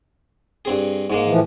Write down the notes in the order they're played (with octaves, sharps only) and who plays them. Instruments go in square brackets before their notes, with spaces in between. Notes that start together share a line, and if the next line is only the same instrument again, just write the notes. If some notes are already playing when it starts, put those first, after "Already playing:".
[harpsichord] G2 C4 G#4
G#2 G#3 A#3
[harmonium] A2 E3 F3